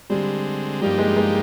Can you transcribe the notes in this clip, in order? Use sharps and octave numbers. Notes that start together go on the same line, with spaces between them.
D3 G3 G#3 C4
G2 F3 G3 A#3 D#4 G4
G#3
G#3